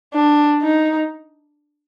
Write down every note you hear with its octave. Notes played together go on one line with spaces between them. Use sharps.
D4
D#4